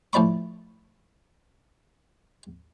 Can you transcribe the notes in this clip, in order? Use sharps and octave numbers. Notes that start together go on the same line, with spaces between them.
A2 F3 D5 B5 C#6